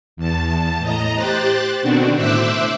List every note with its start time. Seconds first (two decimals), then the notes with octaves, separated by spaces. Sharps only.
0.17 E2 A5
0.79 A2 D#5 A#5
1.15 G4 C5 F#6 A6
1.82 B2 D3 D#3 C4 D4 F#4
2.15 A2 C5 E5 D6 E6 F#6